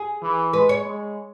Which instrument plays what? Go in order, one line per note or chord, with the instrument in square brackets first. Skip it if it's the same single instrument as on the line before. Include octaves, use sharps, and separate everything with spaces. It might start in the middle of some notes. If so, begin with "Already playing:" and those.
Already playing: [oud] G#4
[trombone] E3
[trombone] G#3 [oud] B4
[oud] C#5
[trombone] G#3